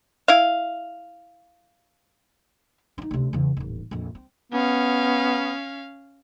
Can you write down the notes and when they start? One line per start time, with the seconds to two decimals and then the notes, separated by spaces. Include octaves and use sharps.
0.28 E4 F5
2.98 C4 D#4
3.11 D2 C3
3.33 E2 C#3
3.57 D#1 A1
3.91 A#1 F2
4.15 C4
4.52 B3 C#4 F5